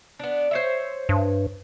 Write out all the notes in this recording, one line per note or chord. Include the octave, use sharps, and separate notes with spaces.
B3 D4
C5 C#5 E5
G2